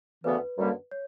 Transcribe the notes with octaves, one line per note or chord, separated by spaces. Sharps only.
D2 C#3 E3 B3 B4
F#2 D3 G3 A#3
C#5